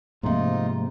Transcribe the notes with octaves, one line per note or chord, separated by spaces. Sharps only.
G#2 C3 F3 A3 A#3 D#4 F4